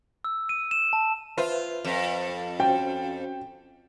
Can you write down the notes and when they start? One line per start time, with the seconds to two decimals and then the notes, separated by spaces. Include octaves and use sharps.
0.24 E6
0.49 D#7
0.71 E7
0.93 A5
1.38 F4 B4 C5 E5
1.85 F2
2.60 C#4 F#4 C5 G5